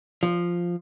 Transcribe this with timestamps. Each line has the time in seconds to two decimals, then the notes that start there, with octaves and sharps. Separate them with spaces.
0.23 F3